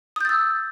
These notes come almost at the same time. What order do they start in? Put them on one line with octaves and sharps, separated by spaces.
D#6 G6 A6 E6